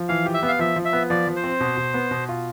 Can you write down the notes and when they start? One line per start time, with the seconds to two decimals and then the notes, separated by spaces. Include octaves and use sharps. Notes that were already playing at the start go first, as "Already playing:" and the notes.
Already playing: F3
0.09 E3 F5
0.26 G4
0.34 E5
0.43 B3
0.48 F5
0.59 F3 E5
0.76 F3
0.85 E5
0.93 B3
1.10 F3 D5
1.27 F3
1.36 C5
1.44 C4
1.60 B2
1.77 B2
1.94 B3
2.11 B2
2.29 F4